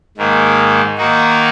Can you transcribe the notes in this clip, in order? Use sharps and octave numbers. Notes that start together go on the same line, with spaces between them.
G#2 D#3 A#3
D#3 A#3 D#4 F#4